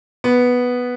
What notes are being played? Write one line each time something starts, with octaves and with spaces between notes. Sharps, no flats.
B3